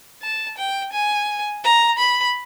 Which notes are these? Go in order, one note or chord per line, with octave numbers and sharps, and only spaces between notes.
A5
G5
G#5
A#5
B5